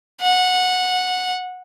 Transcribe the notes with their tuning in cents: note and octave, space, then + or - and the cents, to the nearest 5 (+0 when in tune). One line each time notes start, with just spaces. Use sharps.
F#5 -15